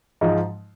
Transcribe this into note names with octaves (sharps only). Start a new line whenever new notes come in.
G#2 F3 G#3 D#4